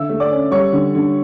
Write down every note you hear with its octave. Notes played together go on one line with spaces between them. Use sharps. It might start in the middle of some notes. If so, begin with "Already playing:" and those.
Already playing: D3 E5 E6
A3
D5 D6
C#4
G3 C#5 C#6
D3
D3